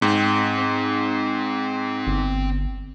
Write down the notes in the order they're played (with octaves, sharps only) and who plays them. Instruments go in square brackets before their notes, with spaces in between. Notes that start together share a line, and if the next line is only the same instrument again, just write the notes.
[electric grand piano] G#2 [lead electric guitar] C4 G5
[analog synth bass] G1